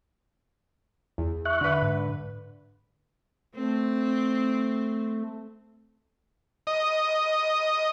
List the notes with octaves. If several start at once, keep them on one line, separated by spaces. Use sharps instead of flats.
E2
E5 C#6 F#6
D3 B4
G#2
A3 C4
D#5